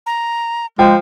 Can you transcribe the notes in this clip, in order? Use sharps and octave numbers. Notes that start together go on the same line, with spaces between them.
A#5
F3 G#3 G5